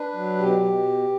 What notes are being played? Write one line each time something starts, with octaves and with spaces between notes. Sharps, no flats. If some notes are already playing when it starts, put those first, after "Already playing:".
Already playing: D4 B4
F#3
B2 G4
B2